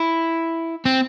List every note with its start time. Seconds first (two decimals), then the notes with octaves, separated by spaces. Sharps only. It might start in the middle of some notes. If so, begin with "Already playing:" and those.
Already playing: E4
0.86 C4